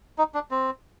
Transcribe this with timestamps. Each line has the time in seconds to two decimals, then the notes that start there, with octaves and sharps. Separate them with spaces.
0.18 D#4
0.34 D4
0.51 C4